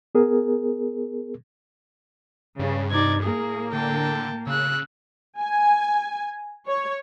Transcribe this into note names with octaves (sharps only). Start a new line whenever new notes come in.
B3 G#4 A#4
G2 C#3
C3 D#4 D5 G#6
A2 A#3 G#4
D3 G5 A5
C#3 E6 F#6
G#5
C#5